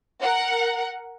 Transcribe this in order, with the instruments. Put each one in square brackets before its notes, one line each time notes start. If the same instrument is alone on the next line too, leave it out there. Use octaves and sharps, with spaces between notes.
[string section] A#4 F#5